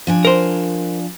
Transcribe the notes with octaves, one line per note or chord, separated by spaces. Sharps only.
F3 D4 G#5
A#4 C5